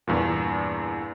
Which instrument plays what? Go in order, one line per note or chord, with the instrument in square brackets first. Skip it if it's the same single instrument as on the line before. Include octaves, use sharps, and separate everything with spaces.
[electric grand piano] E2 G2 A#2